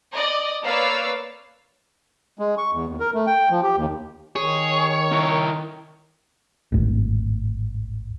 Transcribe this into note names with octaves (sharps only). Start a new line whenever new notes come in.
D5 D#5
A#3 B4 C#5 D5 F5 E6
G#3
C#6
E2
D#2
A#4
A3
G5
F3
G4
D#2
D#3 G#4 C#5
E4 A#4
D1 G#1